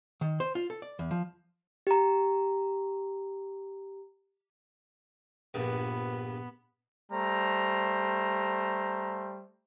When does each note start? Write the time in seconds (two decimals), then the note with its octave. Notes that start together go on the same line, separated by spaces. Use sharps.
0.21 D#3
0.40 C5
0.55 F4
0.70 A4
0.82 D5
0.99 E2
1.11 F3
1.87 G4 A#5
5.54 A#1 G2 B3
7.12 G3 A3 C5 A#5